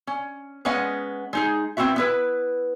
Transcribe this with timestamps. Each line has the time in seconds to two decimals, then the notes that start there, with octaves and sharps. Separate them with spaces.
0.07 C#4
0.65 G#3 B3 C#4 D#5 F#5
1.33 G#3 D#4 G#4
1.77 B3 C4 E4 F#4 E5
1.96 B3 E4 B4